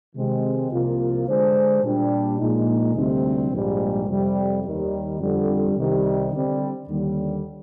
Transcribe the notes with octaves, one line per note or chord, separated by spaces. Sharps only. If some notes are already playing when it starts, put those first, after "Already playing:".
C3 D#3 G#3 C4
C2 C3 F3 A#3 F4
D3 G#3 D4 G#4 C5
A#2 G3 D4 G4
A#1 A#2 G#3 D#4
D2 C3 G3 C4
A#1 G#2 G3
F2 C3 G3
D#2 D#3 G3
F2 D3 G3
C2 C3 D#3 G3
D3 G3 C4
D#2 D3 G3